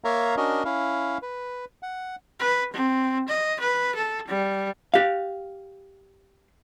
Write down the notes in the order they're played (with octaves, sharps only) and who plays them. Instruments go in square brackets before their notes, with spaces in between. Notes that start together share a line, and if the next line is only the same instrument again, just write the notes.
[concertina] A#3 A#4 C#5 E5 F5 A#5
C#4 D4 F#4 A#4 D#5
C#4 E4 F5
B4
F#5
[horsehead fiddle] B4
C4
D#5
B4
A4
G3
[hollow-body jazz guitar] G4 F5